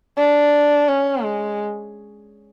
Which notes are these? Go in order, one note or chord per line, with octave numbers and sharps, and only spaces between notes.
D4
C#4
G#3